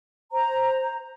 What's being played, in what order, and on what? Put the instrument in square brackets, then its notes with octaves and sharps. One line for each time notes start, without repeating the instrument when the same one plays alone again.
[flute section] C5 A#5